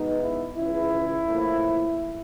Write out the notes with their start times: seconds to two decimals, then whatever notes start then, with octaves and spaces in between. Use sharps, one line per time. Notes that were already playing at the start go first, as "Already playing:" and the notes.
Already playing: B2 G#3 B3 D#4
0.21 E4
0.57 C#2 C#3 E3 E4
1.28 A2 F3 A#3